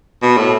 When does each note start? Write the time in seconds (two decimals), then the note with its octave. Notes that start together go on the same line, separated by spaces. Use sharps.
0.22 B2
0.37 A2